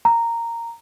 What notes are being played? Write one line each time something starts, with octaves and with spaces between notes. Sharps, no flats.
A#5